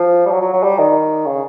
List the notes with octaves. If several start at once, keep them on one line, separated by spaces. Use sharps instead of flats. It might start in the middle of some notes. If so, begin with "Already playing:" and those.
Already playing: F3
G3
F#3
F#3
F#3
G3
D#3
C#3